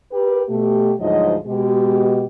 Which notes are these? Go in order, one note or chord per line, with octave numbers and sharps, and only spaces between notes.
G4 A#4 B4
B2 A3 G4
D2 G#2 F3 F#3 D#5
B2 G#3 G4